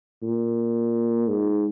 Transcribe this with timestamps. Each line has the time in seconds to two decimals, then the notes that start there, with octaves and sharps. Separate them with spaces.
0.22 A#2
1.28 G#2